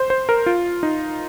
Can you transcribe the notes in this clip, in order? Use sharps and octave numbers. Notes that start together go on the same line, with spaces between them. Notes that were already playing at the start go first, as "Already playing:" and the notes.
Already playing: C5
C5
A#4
F4
D#4